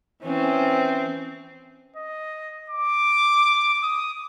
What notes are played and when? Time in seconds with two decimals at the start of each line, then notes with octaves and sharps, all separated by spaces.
0.23 E3 C4 C#4
1.96 D#5
2.70 D6
3.83 D#6